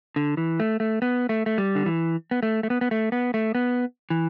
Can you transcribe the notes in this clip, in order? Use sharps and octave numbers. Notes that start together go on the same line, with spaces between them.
D3
E3
A3
A3
B3
A3
A3
G3
D3
E3
B3
A3
A3
B3
B3
A3
B3
A3
B3
E3